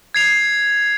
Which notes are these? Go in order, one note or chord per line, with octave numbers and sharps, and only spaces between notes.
G#6 C7 F7